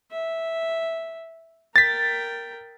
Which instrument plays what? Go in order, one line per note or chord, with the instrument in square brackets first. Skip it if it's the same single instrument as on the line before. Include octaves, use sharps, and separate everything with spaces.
[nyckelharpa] E5
[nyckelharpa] A#4 G5 [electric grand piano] A6 B6